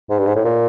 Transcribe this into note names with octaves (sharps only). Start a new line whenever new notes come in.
G#2
G2
G#2
A2
A#2